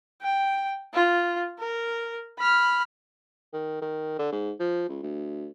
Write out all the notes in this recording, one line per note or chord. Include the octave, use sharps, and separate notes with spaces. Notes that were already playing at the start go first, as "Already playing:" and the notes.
G5
F4
A#4
B5 F6
D#3
D#3
D3
G#2
F3
C#2
D2